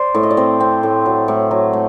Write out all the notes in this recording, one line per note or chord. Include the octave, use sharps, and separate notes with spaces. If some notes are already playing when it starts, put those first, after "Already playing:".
Already playing: C5 D5
A2
D#5
D5
C4 C5
C4
A2
F#3
A2
F#3
A3